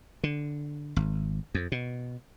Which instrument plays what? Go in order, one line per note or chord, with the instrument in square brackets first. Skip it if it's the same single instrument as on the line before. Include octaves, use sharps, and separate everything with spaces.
[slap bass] D3
G#1
F2
B2